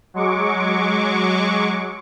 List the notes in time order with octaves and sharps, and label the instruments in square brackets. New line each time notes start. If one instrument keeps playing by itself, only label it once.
[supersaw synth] F#3 G#3 C#6 D6